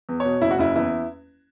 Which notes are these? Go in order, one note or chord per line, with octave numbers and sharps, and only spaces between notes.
E2
B2 C#5
F#1 E4
F#4
F#1 E4
E2 E4